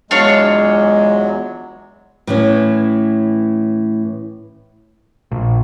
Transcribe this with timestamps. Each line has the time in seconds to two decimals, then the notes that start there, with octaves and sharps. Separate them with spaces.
0.11 E2 F#3 G#3 D4 F4 C#5
2.27 A2 E3 C#4
5.32 A#1